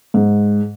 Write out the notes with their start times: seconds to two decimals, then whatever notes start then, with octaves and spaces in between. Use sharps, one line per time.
0.14 G#2